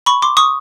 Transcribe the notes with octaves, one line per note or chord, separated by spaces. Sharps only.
B5 C#6
C6 D6
C#6 D#6